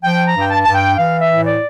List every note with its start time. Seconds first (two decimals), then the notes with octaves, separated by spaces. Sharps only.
0.02 F3 G5
0.26 A#5
0.34 G2
0.39 G5
0.50 A5
0.64 G2 A5
0.73 G5
0.97 E3 F5
1.21 E5
1.29 A2
1.45 D5